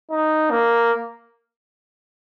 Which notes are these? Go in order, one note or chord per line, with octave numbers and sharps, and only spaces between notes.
D#4
A#3